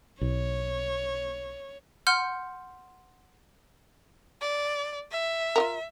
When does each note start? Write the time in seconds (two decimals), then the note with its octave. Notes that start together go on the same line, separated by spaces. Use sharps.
0.21 B1 C#5
2.07 F#5 C6 F6 G6
4.41 D5
5.11 E5
5.56 F4 F#4 A#4